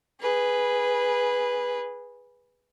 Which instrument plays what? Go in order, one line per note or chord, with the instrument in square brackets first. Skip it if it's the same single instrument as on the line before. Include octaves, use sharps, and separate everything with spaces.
[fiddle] G#4 B4